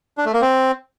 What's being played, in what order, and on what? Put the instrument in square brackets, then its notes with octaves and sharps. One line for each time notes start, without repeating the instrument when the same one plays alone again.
[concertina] D4
A3
A#3
C4